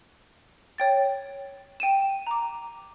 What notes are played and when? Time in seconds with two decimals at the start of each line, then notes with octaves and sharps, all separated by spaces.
0.78 C#5 G5 A6
1.80 G5 D#7 E7
2.27 A#5 D6